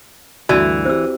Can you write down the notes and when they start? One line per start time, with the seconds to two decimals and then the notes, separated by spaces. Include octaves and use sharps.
0.49 D2 G2 E3 F#4 D5 A#5
0.85 C4 E4 G4 C5 E6